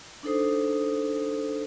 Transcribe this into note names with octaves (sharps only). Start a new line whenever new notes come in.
D4 D#4 A4 C5 D#6